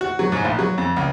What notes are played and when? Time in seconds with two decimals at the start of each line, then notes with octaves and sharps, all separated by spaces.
0.01 F#4
0.19 F#3
0.32 G#2
0.45 A#1
0.59 F#3
0.78 F2
0.97 C#2